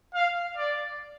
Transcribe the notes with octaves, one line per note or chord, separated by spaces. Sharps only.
F5
D5